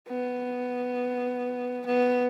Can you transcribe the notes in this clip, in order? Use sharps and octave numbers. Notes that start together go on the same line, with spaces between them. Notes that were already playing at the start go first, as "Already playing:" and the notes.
B3
B3